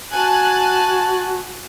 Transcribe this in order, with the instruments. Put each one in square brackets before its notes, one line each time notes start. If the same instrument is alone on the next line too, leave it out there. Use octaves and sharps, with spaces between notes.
[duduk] F#4 [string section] G#5 A5 F#6